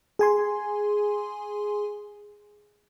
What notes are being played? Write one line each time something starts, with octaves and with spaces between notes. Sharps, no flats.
G#4 G#5 C6